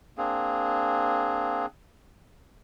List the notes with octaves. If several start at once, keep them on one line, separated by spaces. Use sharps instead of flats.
A#3 C4 D4 G#4